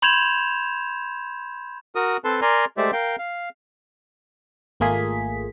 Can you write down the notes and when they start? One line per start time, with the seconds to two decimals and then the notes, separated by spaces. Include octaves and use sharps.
0.02 B5 C6 G6 G#6 E7 F7
1.95 F#4 A#4 D#6
2.25 C4 A4 B4 A5 C6
2.42 A#4 D5 G#5 A#5 C6
2.77 G#3 A3 G4 C5 D5 E5
2.93 A#4 F5 G5
3.19 F5
4.80 G#1 A3 A#3 F4 G#4 B6